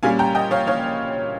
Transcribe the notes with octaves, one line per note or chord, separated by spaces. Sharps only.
A#2 G3 C#4 F5 G#5
G5 A#5
D#5 G5
C#5 F5
C#5 F5